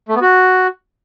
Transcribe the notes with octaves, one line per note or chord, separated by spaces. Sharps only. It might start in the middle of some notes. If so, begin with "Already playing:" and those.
A3
B3
F#4